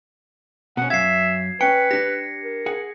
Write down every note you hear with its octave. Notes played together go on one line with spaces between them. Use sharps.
B2 C#4 F#5
F#2 E5 F5 G#6 C7
C#4 B4 G5 C#7
D4 G4 A#6
A#4
G#4 F#5